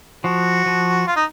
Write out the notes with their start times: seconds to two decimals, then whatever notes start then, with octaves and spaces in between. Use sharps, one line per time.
0.24 F3 F#4
0.66 F3
1.07 F4
1.16 D#4